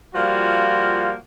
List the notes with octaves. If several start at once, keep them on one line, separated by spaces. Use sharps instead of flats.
F3 G3 A#3 F4 F#4